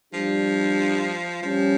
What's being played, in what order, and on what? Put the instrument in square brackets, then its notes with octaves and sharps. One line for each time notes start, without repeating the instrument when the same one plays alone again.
[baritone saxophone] F3 [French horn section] G3 D4 G4
[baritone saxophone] F3 [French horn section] G3 C#4 G4